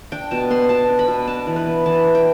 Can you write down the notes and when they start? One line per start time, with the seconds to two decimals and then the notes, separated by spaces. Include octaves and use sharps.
0.12 D4 G5
0.31 B2 A5
0.50 B3 C6
0.69 B2 A5
0.89 D4
0.99 B5
1.08 B2
1.27 D4 A5
1.47 E3
1.56 B4
1.66 B3
1.86 E3 A5
2.04 D4
2.15 G5